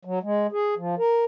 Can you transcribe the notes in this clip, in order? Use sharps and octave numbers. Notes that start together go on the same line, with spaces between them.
F#3
G#3
G#4
F3
A#4